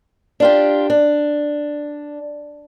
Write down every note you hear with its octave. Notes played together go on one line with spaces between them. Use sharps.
D4 F4 G4
D4